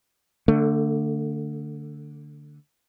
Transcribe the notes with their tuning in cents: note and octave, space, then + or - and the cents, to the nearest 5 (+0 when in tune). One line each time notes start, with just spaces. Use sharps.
D3 +0 A3 +30